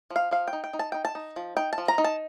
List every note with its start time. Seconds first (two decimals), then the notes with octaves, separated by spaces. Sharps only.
0.10 F3
0.16 F5
0.31 F3 F5
0.48 G5
0.53 D#4
0.64 G5
0.73 D#4
0.79 A5
0.92 D#4 G5
1.05 A5
1.15 D#4
1.36 F3
1.57 D#4 G5
1.73 A5
1.78 F3
1.88 A#5
1.98 D#4
2.04 A5